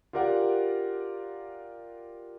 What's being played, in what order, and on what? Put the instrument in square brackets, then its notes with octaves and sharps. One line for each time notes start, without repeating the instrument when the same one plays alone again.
[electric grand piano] F4 G4 A#4 D5 F#5